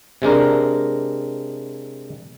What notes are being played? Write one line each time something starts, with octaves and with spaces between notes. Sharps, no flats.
C3 G#3 D4 A#4